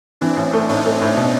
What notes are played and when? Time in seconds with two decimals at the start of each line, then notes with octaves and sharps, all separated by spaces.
0.21 E3 C4 D4
0.37 A1
0.53 A3
0.69 A2 C#4 D#4
0.85 A3
1.02 A2
1.17 B2